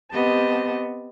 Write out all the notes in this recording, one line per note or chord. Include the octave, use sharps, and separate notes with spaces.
B3 C4 G4 D#5 A5